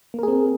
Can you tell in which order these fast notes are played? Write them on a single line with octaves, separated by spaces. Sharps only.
A#3 A#4 G#4 C4